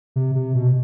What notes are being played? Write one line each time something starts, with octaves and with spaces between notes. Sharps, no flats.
C3
C3
B2